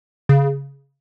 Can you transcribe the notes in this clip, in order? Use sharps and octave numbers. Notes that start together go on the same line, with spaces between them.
C#3